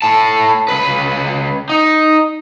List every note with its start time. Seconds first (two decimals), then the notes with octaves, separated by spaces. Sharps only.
0.02 A2 A5
0.68 C#2 B4
1.69 D#4